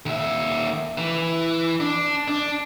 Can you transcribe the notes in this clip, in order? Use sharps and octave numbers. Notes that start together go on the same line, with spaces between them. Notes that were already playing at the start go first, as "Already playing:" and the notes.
D#2 E5
E3
D4
D4